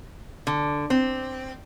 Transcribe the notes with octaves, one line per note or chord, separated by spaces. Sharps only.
D3
C4